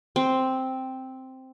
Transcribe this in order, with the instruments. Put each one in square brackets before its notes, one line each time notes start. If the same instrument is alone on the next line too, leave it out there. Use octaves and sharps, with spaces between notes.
[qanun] C4